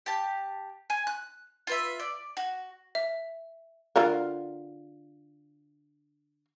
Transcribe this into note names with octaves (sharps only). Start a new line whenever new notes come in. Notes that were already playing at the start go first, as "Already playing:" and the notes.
G4 A5
G#5
F#6
F4 B4 E5
D5
F#4
E5
D3 F4 A#4